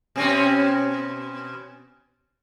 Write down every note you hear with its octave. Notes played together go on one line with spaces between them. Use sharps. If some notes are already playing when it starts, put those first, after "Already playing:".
B2 C4 C#4